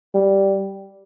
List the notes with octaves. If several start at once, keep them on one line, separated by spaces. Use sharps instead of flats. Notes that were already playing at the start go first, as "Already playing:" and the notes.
G3